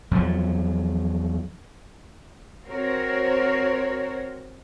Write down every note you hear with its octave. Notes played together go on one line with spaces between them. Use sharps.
E2 F3 F#3
C4 F#4 A#4 C5 C#5